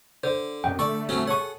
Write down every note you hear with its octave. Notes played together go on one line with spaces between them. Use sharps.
D3 C5
F#2 C3 F#3 D#4 G5
D3 A3 A4 D5 C#6
F#3 C4 C#4
G#4 A4 C#5 F#5 G#5 C#6